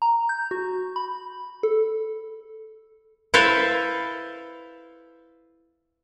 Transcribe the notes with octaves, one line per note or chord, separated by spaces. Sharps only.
A#5
G6
F#4
B5
A4
E4 A4 B4 C5 E5 F5